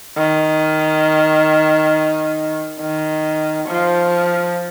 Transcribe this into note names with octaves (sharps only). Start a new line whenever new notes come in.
D#3
D#3
F3